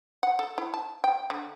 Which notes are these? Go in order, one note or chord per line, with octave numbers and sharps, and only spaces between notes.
F#5
A4
E4
A5
G5
D3